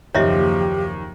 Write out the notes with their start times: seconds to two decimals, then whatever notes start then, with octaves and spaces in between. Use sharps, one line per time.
0.15 F#1 D#2 F3 G4 C#5 D#5 E5